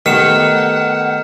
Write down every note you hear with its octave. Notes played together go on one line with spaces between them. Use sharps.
D#3 A3 B3 G4 F#5 F6 C#7 E7